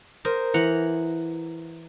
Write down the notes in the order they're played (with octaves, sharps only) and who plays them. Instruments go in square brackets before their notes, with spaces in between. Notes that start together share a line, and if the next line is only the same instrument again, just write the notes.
[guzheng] A#4 C5 D#5
[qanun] E3 [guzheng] F#5 A#5